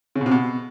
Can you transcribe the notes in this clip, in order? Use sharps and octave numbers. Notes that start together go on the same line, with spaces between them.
C#3
B2
C3
B2